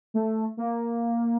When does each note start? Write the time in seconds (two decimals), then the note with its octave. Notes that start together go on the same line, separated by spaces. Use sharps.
0.14 A3
0.57 A#3